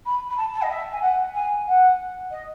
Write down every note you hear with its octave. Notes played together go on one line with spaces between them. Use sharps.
B5
B5
A5
A5
D#5
E5
G#5
F#5
G#5
F#5
D#5